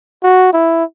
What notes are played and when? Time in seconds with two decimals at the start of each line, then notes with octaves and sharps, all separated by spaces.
0.23 F#4
0.53 E4